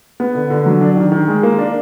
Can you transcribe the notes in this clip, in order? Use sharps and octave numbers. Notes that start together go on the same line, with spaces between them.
B3
D3
D3
F#3
D4
D#3
D#3
G#3
A#3
D4